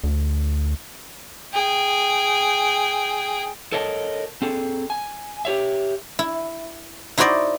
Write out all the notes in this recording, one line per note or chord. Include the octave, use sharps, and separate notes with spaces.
D2
G#4 G5
A4 A#4 C#5 D#5 F5 A5
C4 G#4 A4
G#5
G4 C#5 E5
E4
D#4 E4 F#4 C5 D5 D#5